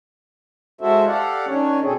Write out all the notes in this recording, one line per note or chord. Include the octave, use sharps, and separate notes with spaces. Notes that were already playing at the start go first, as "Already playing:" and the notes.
G#3 E4 F#4 A4 C5 E5
G4 A4 D5 F5 F#5
D#3 C#4 D4 C#5
B2 C4 G#4 A4